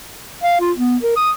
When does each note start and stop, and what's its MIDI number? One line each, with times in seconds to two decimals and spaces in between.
0.44 0.56 77
0.61 0.72 65
0.77 0.96 59
1.03 1.14 70
1.16 1.31 87